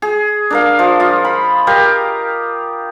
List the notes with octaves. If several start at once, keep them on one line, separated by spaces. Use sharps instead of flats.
G#4
D4 A#4 F5
F3
F4 D#5
B5
G4 A#4 D#5 F5